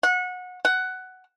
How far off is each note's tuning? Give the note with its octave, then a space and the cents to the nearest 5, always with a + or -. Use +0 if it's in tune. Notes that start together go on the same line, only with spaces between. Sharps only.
F#5 -25
F#5 +10